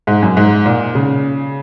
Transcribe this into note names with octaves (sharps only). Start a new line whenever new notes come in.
G#2
F#2
G#2
A#2
C#3